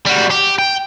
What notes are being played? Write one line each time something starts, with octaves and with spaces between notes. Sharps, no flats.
G3 F#4
G4
G5